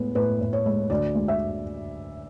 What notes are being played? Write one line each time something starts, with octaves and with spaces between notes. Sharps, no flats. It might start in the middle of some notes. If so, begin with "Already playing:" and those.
Already playing: A2 G#3 B3
A2 B4
A2
C#5
G#3
D2 D5
G#3
E5